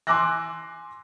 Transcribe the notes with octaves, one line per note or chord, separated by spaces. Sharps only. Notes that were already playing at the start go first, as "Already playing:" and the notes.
G#5 C6 D6 E6 F#6 A#6